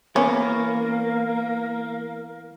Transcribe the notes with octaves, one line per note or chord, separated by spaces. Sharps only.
E3 A#3 B3 C#4 A#4 C#5 F5